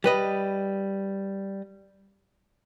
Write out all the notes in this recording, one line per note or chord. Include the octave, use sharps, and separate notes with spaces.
G3 B4 D#5